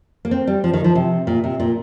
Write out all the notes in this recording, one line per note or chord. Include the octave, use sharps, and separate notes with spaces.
A#3
C4
G3
F3
D#3
F3
C3
A#2
C3
A#2